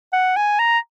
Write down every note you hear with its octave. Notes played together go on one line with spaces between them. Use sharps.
F#5
G#5
A#5